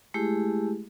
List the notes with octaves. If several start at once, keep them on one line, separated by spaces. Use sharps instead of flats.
G#3 A3 E4 G4 G#4